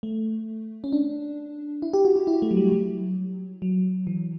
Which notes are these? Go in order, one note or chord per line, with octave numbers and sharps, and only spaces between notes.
A3
C#4
D4
E4
G4
F#4
F#4
E4
A3
F#3
G3
F#3
F#3
E3